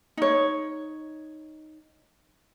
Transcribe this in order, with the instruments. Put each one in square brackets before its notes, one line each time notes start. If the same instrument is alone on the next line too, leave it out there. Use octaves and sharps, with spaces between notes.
[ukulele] D#4 C#5